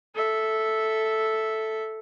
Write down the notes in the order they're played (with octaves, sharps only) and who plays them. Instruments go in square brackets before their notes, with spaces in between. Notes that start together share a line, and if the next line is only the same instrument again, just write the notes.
[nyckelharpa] A4 E5